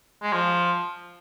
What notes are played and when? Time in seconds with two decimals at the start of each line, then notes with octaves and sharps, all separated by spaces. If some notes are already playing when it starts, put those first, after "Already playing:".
0.22 G#3
0.33 F3